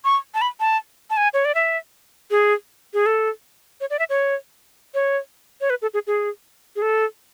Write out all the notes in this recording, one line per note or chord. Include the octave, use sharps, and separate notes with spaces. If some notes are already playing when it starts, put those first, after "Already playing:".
C#6
A5
B5
A5
A5
G#5
C#5
D5
E5
G#4
G#4
A4
C#5
D5
E5
C#5
C#5
C#5
B4
A4
G#4
G#4
G#4
A4